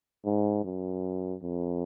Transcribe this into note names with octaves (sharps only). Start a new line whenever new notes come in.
G#2
F#2
F2